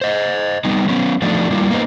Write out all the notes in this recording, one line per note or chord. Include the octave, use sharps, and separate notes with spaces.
C5 D#5
G3 B3 D#4
F#3 B3 C#4
F3 A3 D4 D#4 F#4
G3 A#3 E4 F4
A#3 B3 D#4 B4 C5